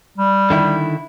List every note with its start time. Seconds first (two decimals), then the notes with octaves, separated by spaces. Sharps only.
0.18 G3
0.50 D3 D#3 E4